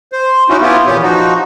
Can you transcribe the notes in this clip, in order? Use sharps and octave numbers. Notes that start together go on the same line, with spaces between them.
C5
C#4 D#4 E4 F#4
B3 E4 F4 G4
E2 A#2 B3 C#4 G4
F3 D#4 F#4